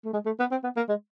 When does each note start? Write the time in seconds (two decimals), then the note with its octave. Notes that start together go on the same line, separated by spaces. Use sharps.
0.05 A3
0.13 G#3
0.26 A3
0.39 B3
0.51 C4
0.64 B3
0.76 A#3
0.89 G#3